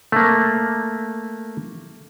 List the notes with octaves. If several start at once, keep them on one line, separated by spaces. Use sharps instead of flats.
A3 A#3